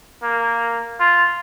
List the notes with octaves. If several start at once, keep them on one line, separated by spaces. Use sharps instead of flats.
A#3
F4